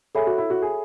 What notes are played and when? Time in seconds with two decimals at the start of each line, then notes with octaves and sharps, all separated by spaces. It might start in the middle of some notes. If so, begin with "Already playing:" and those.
0.15 G#4 A4 C#5 E5 B5
0.27 F#4
0.38 E4
0.50 F#4
0.62 G#4